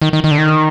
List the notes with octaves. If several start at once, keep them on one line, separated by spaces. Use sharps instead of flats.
D#3
D#3
D#3
D3
D#3